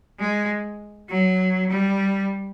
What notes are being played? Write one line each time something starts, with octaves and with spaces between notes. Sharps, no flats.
G#3
F#3
G3